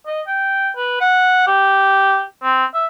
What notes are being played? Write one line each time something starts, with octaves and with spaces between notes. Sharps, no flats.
D#5
G5
B4
F#5
G4
C4
E5